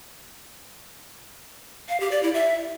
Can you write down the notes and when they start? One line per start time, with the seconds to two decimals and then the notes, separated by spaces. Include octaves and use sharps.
1.89 F5
2.00 G4
2.11 D5
2.23 E4
2.34 E5